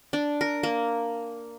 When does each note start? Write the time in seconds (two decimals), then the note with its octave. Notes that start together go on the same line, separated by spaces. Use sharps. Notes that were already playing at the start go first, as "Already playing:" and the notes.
0.13 D4
0.41 A#4
0.63 A#3